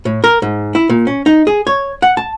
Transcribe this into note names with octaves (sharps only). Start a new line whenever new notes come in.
A2
A#4
G#2
E4
A#2
C#4
D#4
G#4
C#5
F#5
A5